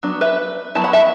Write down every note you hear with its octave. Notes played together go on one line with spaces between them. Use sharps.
F#3 B3 D4
B4 E5
F#3 B3 E4 A5
F#5 B5
E5 A5